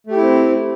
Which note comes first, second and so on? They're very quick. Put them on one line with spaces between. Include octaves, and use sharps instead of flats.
A3 G4 E4 C4